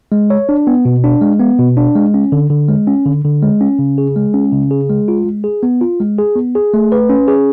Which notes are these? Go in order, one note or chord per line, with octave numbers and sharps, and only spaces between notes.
G#3
C#5
D4
B3
B2
D4
G#3
B3
B2
D4
G#3
C#4
D3
D3
G#3
C#4
D3
D3
G#3
C#4
C#3
G#4
G#3
C#4
C#3
G#4
G#3
F4
G#3
G#4
B3
F4
G#3
G#4
B3
G#4
A3
B4
C#4
G#4